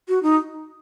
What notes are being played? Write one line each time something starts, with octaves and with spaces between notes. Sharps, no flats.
F#4
D#4